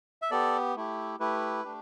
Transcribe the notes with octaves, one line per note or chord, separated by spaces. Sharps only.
E5
B3 G4 A4 D5
A3 E4 G4
A3 E4 G4 B4
A3 D4 G4